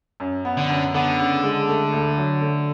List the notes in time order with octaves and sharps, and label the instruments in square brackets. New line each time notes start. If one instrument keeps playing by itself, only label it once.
[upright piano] F#2
B3
[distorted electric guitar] D3
[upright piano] F#2
[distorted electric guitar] D3 [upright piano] B3
[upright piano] C#3
G#3
A3
D2
F#3
A3